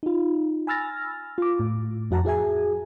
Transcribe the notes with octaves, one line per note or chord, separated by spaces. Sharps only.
D#4 F4
G#5 B5 E6 F6 A6 A#6
F4 D6
A2
F2 F#4 F#5 A5 A#5
F#4 G#4 E5 G#5